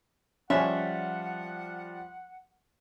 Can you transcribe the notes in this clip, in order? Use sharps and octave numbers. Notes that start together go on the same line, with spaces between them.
F3 G3 C#4 E5 F#5